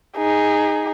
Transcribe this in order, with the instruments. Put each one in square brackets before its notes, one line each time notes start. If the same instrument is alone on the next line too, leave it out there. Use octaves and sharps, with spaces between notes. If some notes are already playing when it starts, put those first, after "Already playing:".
[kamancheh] D#4 G#4